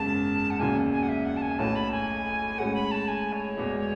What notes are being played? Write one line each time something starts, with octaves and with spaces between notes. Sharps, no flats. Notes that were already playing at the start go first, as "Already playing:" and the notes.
Already playing: G#1 F#2 C#3 G#3 B3 A5
F#5
E1 D#2 C#3 F#3 G#5
G#5
F#5
E5
F#5
A5
G#5
B1 A2 F#3 C#4 F#4 A5
B5
G#5
A2 G#3 C#4 F#4 F#5
B5
A5
G#5
C#5
E1 E2 B2 G#3